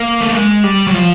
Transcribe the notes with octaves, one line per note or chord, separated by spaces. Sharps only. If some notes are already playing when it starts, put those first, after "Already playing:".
Already playing: A#3
A3
G#3
G3
F#3
F3